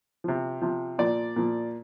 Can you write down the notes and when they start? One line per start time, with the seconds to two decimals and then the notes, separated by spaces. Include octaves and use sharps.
0.24 C3 F3
0.62 C3 F3
0.98 A#2 F3 D5
1.36 A#2 F3